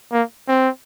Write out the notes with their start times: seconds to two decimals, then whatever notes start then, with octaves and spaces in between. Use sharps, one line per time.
0.12 A#3
0.48 C4